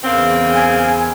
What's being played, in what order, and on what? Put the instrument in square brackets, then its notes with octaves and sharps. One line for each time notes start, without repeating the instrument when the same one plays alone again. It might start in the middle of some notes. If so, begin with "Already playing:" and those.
[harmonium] E2 [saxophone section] C#3 A#3 C4
[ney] G#5